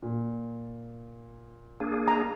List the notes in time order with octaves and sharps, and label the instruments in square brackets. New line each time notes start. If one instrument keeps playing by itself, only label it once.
[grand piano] A#2
[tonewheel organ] A#3 D4 G#4
[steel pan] A#5